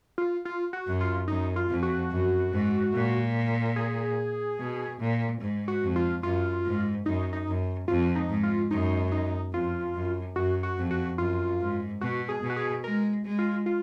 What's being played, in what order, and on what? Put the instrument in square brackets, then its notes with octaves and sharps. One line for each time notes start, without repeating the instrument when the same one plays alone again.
[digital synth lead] F4
F4
F#4
[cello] F#2
[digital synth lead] F4
[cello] F#2 [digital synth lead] D#4
[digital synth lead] F4
[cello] F2
[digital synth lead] F#4
[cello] F#2
G#2
A#2
[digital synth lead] G#4
[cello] B2
A#2
G#2
[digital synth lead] F#4
[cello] F2
[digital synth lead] F4
[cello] F#2 [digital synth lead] F4
[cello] G#2
[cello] F#2 [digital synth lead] D#4
[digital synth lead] D#4
[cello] F#2
[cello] F2 [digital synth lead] F4
[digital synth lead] D#4
[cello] G#2
[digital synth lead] F4
[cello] F#2 [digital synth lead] D#4
[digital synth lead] D#4
[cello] F2 [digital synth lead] F4
[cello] F#2
[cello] F#2 [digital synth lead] F#4
[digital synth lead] F#4
[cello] F2
[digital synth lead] F#4
[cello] F#2 [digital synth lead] F4
[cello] G#2
[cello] B2 [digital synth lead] F#4
[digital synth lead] G#4
[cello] B2
[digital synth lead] F#4
G#4
[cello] G#3 [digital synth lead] A#4
[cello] G#3
[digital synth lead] F4
F4